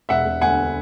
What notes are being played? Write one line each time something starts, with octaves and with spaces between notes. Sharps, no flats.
E1 E5 F#5
E1
D2 F#5 G#5